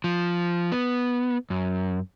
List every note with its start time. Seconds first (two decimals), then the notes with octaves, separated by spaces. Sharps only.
0.04 F3
0.72 B3
1.50 F#2